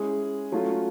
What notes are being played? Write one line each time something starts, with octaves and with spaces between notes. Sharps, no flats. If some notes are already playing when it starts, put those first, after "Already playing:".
Already playing: G#3 C#4 E4 G#4
F#3 A3 C#4 F4